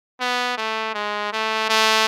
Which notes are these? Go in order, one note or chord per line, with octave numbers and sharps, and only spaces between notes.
B3
A3
G#3
A3
A3